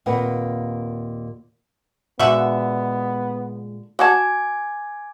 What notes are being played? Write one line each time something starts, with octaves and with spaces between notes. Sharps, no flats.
D#2 A#2 A#3 C4 B4 F#5
A#2 D3 G#3 B3 F#4 E5
F#4 F#5 G#5 A5 D6 G#6